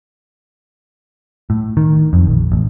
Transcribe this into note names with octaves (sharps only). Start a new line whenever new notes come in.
A2
D#3
F2
A#1
A1